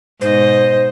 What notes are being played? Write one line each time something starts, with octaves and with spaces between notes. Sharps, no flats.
G#2 B2 C5 D#5